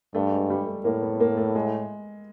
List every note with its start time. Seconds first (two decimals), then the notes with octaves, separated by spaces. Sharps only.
0.15 G2 A3
0.32 G#3
0.50 G3
0.67 A3
0.85 A2 A#3
1.02 B3
1.20 A#3
1.37 A3
1.55 G#3